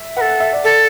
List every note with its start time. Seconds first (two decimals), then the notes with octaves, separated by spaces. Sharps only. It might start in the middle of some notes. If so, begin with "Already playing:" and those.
Already playing: E5
0.16 B4 F#5
0.21 A4
0.28 F#5
0.40 E5
0.53 D5
0.64 A4